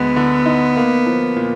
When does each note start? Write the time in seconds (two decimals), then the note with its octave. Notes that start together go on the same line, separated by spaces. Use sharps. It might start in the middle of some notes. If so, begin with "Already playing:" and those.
Already playing: D2 D3 G#3 B3
0.16 D3
0.45 D#4
0.77 A#3
1.06 F3
1.36 A#2